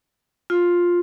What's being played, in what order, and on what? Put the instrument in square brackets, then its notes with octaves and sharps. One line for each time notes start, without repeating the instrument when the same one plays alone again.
[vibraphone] F4